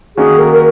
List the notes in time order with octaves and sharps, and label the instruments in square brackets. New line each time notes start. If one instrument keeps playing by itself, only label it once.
[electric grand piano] D#3 A#3 C#4 F#4 [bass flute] G#4
[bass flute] A#4
A#4